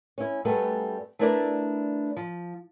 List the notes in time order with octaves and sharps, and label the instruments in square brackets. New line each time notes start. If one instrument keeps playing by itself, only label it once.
[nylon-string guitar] C#4 E4
F#2 G3 A3 B3 A4
A3 B3 D4 E4 A#4 D5
F3